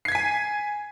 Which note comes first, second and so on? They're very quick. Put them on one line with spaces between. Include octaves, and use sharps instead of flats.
C7 G#6 B6 G#5